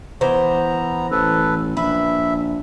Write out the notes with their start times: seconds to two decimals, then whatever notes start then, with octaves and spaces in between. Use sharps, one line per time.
0.21 E3 B3 C5 A#5
1.11 A1 A4 B4
1.77 A#1 B4 E5